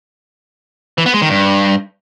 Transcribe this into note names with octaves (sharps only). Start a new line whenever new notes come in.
E3
B3
G#3
D#3
G2